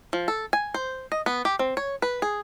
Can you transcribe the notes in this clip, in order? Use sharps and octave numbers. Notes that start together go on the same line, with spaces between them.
F3
A4
G#5
C5
D#5
B3
G4
C4
C#5
B4
G#4